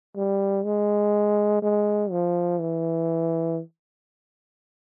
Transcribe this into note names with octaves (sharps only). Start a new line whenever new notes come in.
G3
G#3
G#3
F3
E3